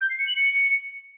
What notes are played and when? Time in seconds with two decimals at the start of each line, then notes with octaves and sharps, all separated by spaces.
0.01 G6
0.10 C7
0.19 C#7
0.27 F#7
0.36 C#7